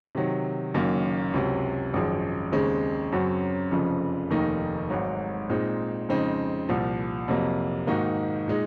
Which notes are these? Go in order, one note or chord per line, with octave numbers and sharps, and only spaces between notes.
C3 D#3 F#3
F#1 F#2 D#3 A#3
C#2 C3 F#3
G#1 F#2 F3 G#3
D#2 C#3 G#3 C4
F#2 C#3 F#3 C4 F#4
F1 F2 C#3 F3
F1 D#2 D#3 A#3 D#4
G#1 G#2 F#3
A#2 G#3 C4 D#4
F2 C#3 G#3 C4 D#4
C2 A#2 F3
F2 C3 F#3 A#3
G#2 D#3 A#3 D#4 F#4
A#2 G#3 D#4